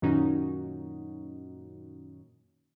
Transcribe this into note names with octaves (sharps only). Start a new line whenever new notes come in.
F#2 A#2 D#3 C#4 D#4 F#4